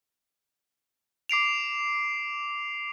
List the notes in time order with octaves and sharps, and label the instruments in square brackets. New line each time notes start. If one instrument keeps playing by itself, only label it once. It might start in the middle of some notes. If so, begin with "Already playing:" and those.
[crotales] D6 C7 D7 F7